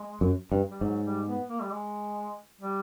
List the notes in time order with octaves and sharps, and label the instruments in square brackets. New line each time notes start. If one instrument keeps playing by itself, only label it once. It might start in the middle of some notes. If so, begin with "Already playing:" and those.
Already playing: [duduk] G#3
[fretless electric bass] F#2
G2
[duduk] G3
[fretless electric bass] G#2 [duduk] F#3
[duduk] G3
B3
A#3
G3
G#3
G3